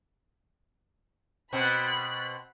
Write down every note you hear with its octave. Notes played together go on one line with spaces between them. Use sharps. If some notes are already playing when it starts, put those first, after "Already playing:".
B2 C4 B5 F#6